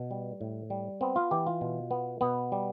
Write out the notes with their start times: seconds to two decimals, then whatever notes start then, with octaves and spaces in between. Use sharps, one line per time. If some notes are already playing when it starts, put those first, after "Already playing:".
Already playing: B2
0.11 G3
0.41 A2
0.70 G3
1.01 B3 C4
1.16 F4
1.31 E3 G4
1.46 F4
1.61 B2
1.91 B3
2.21 B2 B3
2.52 G3